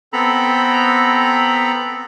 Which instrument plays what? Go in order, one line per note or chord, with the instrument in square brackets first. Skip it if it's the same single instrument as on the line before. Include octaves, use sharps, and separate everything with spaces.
[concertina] B3 C4 A4 A#5 B5